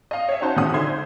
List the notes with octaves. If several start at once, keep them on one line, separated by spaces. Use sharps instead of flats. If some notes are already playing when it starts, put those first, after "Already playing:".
D#5 F5
C#5 E5
C#4 D#4 F#4 C5 A5
F2 D#3 G#3 F#5 D#6
D3 E5 C6 G#6
C5